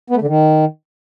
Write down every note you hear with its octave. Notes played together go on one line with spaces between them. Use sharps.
B3
A3
D3
D#3